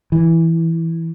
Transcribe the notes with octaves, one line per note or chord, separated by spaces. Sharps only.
E3